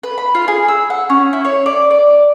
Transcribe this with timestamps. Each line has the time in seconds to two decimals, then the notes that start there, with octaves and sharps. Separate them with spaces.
0.03 B4
0.18 B5
0.35 F4
0.48 G#4
0.68 E6
0.90 F#5
1.10 C#4
1.33 E4
1.45 C#5
1.66 D5
1.91 D5